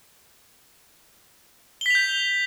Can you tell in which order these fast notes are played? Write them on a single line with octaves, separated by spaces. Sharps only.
G7 B6 F7 G6